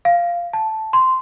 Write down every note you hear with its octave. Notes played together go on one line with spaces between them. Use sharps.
F5
A5
C6